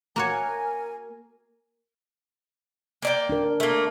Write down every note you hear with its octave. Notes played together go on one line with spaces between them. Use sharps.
A#3 F#4 A#4 C#5 G#5
A#3 D5 G5
D4 A#4
A3 A#3